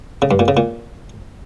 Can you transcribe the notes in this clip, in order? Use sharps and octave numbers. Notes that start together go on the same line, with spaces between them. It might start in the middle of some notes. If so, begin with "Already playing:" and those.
C#3
G2
A#2
C#3
A#2